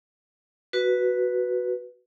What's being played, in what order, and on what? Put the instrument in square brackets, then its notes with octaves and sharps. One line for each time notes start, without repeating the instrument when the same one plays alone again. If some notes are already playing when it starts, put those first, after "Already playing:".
[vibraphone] F#4 B4